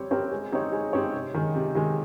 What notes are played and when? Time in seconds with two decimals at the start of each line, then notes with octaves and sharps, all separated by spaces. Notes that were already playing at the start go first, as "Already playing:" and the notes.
Already playing: G3 C4 G4 C#5
0.11 C4 G4 A#4 C#5
0.32 G#3
0.52 C4 D#4 G4 C#5
0.72 G#3
0.93 C4 D#4 G4 C#5
1.14 C3
1.34 D#3 G#3
1.55 C3
1.75 D#3 G#3